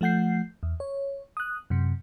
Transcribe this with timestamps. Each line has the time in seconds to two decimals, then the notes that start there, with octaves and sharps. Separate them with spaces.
0.01 F3 A3 F#5 G6 C7
0.63 E2
0.80 C#5
1.37 D#6 F#6
1.70 F#2 C3